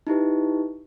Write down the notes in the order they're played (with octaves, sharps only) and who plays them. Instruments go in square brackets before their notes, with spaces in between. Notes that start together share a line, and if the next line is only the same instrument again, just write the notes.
[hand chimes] D#4 E4 G4 B4